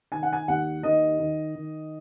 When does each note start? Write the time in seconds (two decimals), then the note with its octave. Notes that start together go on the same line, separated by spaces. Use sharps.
0.12 D#3 G#5
0.23 F#5
0.33 G#5
0.48 D#2 F#5
0.83 D#3 D#5
1.19 D#3
1.55 D#3